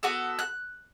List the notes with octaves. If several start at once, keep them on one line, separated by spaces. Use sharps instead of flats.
B3 F#4 A4 F#6
F#6